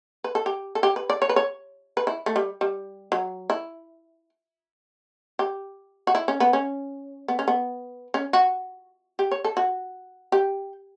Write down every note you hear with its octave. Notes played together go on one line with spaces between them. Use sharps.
B4
A4
G4
A4
G4
B4
D5
C#5
B4
C#5
B4
E4
A3
G3
G3
F#3
E4
G4
F#4
E4
C#4
B3
C#4
B3
C#4
B3
C#4
F#4
G4
C#5
A4
F#4
G4